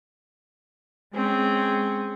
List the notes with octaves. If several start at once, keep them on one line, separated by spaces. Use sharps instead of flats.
G#3 C4 C#4 G#4